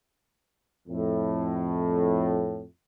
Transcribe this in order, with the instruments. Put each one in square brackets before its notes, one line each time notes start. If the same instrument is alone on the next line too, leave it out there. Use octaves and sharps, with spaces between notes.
[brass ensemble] F2 A2